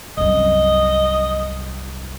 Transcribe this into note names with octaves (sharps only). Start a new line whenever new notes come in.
C2 F#2 D#5